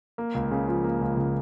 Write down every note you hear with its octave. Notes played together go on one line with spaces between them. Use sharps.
A#3
C#2
C#3
F3
A#3
C#2
C#3